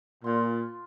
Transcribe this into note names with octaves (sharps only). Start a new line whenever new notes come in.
A#2 F4 C6